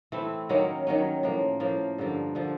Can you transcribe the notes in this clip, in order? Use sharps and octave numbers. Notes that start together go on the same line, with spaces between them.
E3 A3 C4 E4
D#3 F#3 A#3 C#4
D#3 F#3 A#3 C#4
A2 F3 A#3
A2 F3 A#3
G2 D3 F3 A#3
D3 F3 A#3